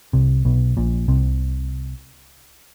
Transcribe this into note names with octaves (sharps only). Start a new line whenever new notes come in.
C2 C3
B1 B2
A#1 A#2
C2 C3